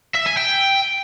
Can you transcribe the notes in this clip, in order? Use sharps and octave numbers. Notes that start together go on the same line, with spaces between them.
E5
G#5
G5